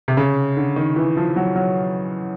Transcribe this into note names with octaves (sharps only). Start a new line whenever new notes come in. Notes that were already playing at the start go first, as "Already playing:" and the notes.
C3
C#3
D3
D#3
E3
F3
F#3
F#3